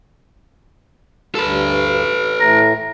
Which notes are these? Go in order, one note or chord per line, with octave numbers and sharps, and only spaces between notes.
D2 G2 A4 B4
A2 E3 A3 A#5